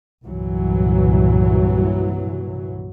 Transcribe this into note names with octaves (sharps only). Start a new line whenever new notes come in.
C2 G2 A#2 E3 F#3